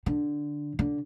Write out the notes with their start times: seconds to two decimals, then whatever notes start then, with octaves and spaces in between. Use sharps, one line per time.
0.06 D3
0.79 D3